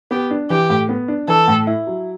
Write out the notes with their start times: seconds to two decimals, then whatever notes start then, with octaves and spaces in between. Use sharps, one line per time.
0.11 B3 G4
0.31 D4
0.50 E3 G4
0.70 A2
0.89 B3
1.08 D4
1.28 E3 A4
1.48 A2
1.67 E4
1.87 F#3